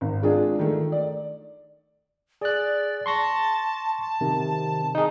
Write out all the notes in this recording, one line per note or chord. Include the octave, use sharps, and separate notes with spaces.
G#1
G#3 D4 F4 G#4
D#3 A3
D5
G#4 D5 F#6
A5 C6 C#6 A#6
A5
C3 D#3
D#4 G#4